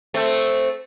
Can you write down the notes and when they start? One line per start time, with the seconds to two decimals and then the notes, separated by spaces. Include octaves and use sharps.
0.14 A3 C4